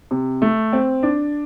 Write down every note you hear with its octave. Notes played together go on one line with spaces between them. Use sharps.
C3
A3
C4
D4